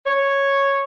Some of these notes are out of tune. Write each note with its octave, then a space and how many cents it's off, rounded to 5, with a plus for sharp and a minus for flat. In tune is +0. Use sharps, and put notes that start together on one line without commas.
C#5 -5